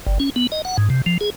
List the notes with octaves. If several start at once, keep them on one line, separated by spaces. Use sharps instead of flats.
G1
C#4
B3
D#5
F#5
G#2
C3
F3
G#4